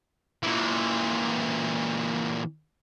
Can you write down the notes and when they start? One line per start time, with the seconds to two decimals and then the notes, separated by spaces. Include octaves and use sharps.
0.43 A#2 E3